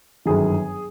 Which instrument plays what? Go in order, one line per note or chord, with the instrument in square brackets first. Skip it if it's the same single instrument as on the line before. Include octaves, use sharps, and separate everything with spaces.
[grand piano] G1 F#2 D#3 G#4